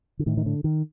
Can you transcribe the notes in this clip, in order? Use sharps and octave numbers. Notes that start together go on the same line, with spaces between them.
D3
A2 D#3
D#3
D3
D#3